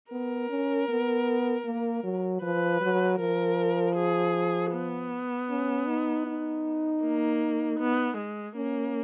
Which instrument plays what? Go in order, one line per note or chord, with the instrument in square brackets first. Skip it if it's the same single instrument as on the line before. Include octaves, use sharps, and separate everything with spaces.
[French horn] B3 [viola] A#4
[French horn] C#4
B3
A#3
F#3
[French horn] F3 [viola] B4
[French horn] F#3
[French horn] F3 [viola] A#4
[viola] G#4
B3
[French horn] C#4
D#4
D#4
[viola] A#3
B3
G#3
[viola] A#3 [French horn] C#4